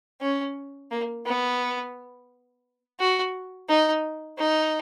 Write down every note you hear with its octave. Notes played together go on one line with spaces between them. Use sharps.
C#4
A#3
B3
F#4
D#4
D#4